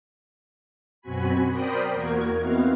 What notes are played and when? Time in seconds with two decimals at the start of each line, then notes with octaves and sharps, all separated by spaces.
1.01 F#2 B2 C4 F#4 G#5 B5
1.49 A#4 C5 D5 G5 B5 D#6
1.93 E2 A#3 F#4 A#4 G#6
2.36 B3 C4 D#4 E4 F#4 F5